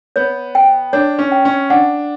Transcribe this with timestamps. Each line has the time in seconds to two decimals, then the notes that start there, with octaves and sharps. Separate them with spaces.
0.16 B3 C#5
0.55 G5
0.93 D4 C#5
1.19 C#4
1.32 G5
1.45 C#4
1.70 D4 F#5